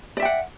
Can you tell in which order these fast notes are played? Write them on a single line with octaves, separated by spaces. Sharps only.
D5 E5 G5 F#5